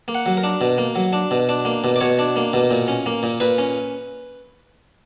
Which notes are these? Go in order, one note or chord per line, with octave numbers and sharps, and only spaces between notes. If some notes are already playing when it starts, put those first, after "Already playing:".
A#3
F#5
F#3
A#4
D4
B2
A#3
F#3
D4
B2
D4
A#3
B2
D5
B2 C#5
D4
A#3
B2
A#2
C#4
A#3
A#2
A#2 B4
C#4